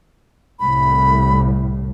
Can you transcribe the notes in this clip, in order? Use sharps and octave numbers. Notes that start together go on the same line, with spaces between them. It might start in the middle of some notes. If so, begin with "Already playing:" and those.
C2 A2 B5